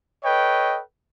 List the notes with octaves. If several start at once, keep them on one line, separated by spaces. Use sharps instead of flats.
A4 B4 C#5 D#5 G5